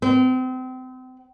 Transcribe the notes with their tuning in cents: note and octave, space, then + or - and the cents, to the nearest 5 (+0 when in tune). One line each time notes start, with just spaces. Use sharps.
C4 -35